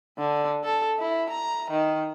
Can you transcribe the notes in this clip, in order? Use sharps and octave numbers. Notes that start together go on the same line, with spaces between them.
D3
A4
E4
A#5
D#3